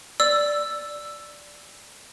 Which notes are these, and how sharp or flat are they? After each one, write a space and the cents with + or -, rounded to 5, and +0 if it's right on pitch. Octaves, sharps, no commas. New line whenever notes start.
D5 +0 E6 +10